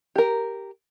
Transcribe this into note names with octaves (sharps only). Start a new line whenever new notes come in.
G4 A#4